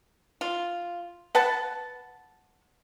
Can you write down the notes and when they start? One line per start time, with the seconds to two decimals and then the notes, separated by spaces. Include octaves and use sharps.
0.41 F4
1.35 B4 F#5 A5